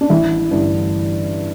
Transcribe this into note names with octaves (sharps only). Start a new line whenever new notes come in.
D4
A1 E4
G2 D3 E4